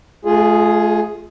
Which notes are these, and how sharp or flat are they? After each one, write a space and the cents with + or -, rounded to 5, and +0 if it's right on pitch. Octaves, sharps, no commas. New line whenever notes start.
A3 -45 F4 +0 G#4 +0